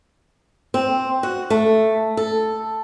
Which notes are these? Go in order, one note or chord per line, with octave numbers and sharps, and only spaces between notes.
C4
F#4
A3
A4